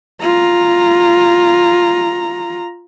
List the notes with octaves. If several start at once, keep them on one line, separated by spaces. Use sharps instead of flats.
F4 A#5